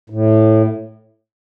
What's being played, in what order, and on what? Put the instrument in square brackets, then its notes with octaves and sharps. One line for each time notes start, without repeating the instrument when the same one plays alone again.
[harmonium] A2